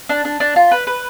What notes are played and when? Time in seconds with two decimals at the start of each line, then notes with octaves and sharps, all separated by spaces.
0.09 D4
0.25 D4
0.40 D4
0.56 F4
0.71 B4
0.87 B4